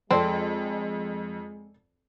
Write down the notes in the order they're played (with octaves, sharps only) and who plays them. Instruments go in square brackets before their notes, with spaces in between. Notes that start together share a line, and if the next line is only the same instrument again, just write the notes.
[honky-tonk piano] F2 [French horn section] G#3 [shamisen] C4 [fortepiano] A4 D5 C6